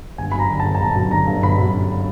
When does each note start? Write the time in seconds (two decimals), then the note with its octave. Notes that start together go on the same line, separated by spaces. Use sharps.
0.18 G1 G#5
0.32 F#2 B5
0.39 A#5
0.49 D3
0.60 G1 A5
0.75 A5
0.80 G1 A#5
0.95 F#2
1.11 D3 A#5
1.27 G1
1.42 G1 B5
1.58 F#2
1.74 D3